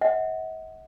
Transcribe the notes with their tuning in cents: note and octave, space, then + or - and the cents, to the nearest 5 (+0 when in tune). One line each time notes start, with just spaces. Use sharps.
D#5 +45 F#5 +0